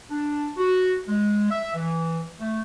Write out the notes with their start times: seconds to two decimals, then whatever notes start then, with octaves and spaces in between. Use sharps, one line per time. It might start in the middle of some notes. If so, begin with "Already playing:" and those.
0.10 D4
0.57 F#4
1.07 G#3
1.50 E5
1.75 E3
2.39 A3